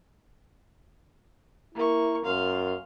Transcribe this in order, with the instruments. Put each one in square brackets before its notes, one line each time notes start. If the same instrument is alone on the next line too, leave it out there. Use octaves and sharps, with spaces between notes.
[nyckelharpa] A#3 C#6 [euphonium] E4
[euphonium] F#2 [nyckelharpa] F5 C6